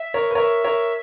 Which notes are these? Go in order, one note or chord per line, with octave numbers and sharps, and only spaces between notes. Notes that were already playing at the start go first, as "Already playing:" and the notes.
Already playing: E5
A#4 C#5
B4
A#4 C#5 E5
A#4 C#5